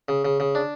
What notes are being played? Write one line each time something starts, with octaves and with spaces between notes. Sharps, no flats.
C#3
C#3
C#3
D4